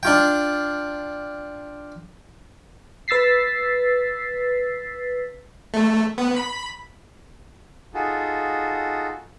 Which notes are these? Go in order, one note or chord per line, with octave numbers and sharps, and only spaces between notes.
D4 F4 G5
B4 E6 A6 B6 C7
A3
B3
B5
D#4 F4 F#4 G#4 A4